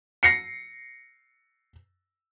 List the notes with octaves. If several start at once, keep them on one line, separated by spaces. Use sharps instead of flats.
A#6 C7 C#7